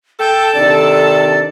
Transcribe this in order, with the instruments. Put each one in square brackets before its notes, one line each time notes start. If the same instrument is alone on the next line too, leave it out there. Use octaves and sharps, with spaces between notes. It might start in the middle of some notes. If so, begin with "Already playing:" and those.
[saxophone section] A4 [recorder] G5
[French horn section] C3 D#3 D4 [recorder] D5